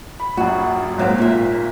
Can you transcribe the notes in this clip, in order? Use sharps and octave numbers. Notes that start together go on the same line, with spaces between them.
B5
A#1 F#2 F#4
G#1 G#2 F#3 A#3 C4
A#2 E5